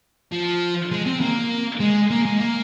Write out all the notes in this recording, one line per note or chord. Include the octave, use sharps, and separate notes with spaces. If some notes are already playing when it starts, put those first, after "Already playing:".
F3
G#3
C4
A#3
G#3
A#3
G#3
A#3